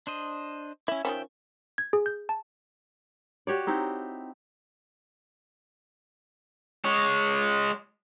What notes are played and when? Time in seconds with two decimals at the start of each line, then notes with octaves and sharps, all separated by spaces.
0.07 D4 C5 D#5
0.88 C#4 E4 E5
1.05 D#3 F3 C#4 E5 G5
1.78 G#6
1.93 G#4
2.06 G6
2.29 A5
3.47 F#4 G4 C#5 D5
3.67 C4 D#4 E4
6.85 G#3 C#5